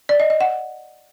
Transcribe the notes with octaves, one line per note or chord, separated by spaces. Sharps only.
D5
D#5
D#5
F#5